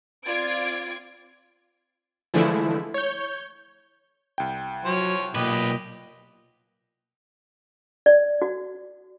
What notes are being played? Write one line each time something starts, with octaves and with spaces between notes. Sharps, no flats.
C4 F4 D5 G#6 D7
D3 E3 F3 G#3 A3 E4
C#5 G6
C2 G5
F3 F#3 C#5
B1 A#2 G4 B4 D#5
D5
F#4